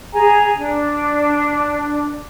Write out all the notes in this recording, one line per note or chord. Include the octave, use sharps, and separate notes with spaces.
G#4 G#5 A#5
D4